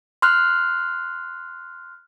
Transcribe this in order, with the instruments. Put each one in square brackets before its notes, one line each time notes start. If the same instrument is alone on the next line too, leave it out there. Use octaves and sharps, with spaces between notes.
[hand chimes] C6 F6 F#6